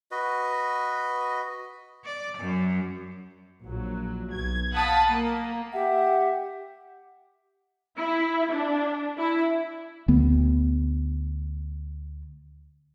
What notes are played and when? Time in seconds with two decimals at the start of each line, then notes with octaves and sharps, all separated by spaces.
0.11 F#4 B4 D#5
2.04 D5
2.38 F#2
3.63 A#1 F#3
4.32 B1 G#6
4.72 F5 F#5 A5 B5 D#6
5.07 A#3
5.72 G4 E5 F#5
7.98 E4
8.51 D4
9.17 E4
10.08 D2 A3 B3